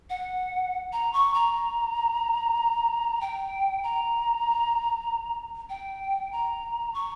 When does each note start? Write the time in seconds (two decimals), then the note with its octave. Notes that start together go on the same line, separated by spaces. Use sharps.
0.10 F#5
0.93 A#5
1.13 C#6
1.34 A#5
3.21 G5
3.83 A#5
5.70 G5
6.32 A#5
6.94 C#6